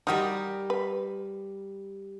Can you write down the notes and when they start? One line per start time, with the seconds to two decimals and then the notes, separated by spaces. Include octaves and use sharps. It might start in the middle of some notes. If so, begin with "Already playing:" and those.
0.07 G3 D#4 F#4 G4 A#4
0.70 B4